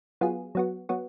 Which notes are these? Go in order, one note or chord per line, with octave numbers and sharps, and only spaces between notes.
F#3 B3 F4 G#4
F#3 B3 F#4
F#3 B3 F#4